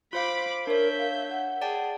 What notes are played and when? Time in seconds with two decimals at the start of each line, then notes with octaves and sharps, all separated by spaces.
0.13 F4 C5 F5 B5 D6
0.67 D4 A#4 C#5 E5 G6
0.99 F5
1.30 F#5
1.61 G#4 D5 G5 A5